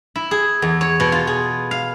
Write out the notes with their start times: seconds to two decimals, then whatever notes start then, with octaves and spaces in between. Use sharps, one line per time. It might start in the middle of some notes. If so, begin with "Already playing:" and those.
0.16 E4
0.31 G#4
0.62 E2
0.81 C#5
1.00 B2
1.12 F4
1.27 G#4
1.71 F5